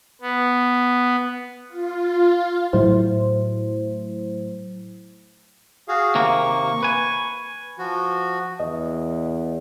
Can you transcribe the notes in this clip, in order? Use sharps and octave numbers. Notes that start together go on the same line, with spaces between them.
B3
F4
A2 F#3 A3 E4 C5
F#4 G#4 F5
D#2 C3 A#3 C#6
B4 G#5
F3 F#4
E2 D#5